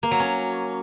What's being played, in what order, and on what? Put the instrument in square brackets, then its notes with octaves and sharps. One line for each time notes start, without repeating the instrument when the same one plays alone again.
[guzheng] A#3
F#3
C#4